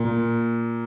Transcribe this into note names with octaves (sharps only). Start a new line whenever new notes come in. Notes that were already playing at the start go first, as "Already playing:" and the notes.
Already playing: A#2